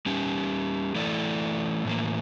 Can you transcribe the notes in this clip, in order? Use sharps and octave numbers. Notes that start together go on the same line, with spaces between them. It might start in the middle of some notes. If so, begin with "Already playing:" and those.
G3 C#4 G4
E3 A3 E4 A4 D5
A2 E3 A#3